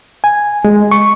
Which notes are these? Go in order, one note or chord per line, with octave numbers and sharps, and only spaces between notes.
G#5
G#3
C#6